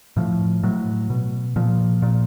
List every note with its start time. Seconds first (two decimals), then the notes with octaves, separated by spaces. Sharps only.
0.17 A2 F3
0.63 A2 F#3
1.10 B2
1.56 A#2 F3
2.02 A#2